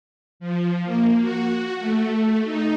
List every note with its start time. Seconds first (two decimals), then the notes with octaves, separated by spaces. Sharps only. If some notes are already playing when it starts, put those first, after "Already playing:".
0.40 F3
0.85 A#3
1.20 F#4
1.80 A3
2.44 D#4